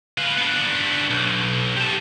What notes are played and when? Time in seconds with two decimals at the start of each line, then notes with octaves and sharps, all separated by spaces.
0.18 F4 B4
0.37 B3 D4
1.10 B1
1.77 G4 A5